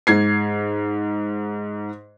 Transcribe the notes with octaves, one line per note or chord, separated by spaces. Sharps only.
G#2 G#6 C7